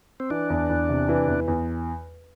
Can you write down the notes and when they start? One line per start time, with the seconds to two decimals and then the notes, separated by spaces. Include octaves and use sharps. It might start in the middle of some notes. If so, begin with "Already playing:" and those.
0.20 C4
0.30 E3 D4
0.50 E2
0.69 E2
0.89 C3
1.09 E3
1.28 E2
1.48 E2